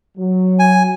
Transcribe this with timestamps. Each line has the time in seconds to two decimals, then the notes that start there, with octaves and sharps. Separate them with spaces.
0.17 F#3
0.59 G#5